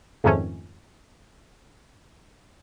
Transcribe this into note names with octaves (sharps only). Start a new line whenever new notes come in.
F2 G#2 D#3 A3 C#4